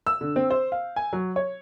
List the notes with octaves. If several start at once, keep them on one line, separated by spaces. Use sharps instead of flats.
E6
D3
C4
C5
F5
G#5
F#3
C#5